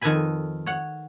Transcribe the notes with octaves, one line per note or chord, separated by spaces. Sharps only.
F2 D#3 A4 B4 G#5 B5
C#5 F#5